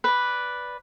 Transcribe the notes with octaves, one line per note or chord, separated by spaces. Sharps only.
B4 D5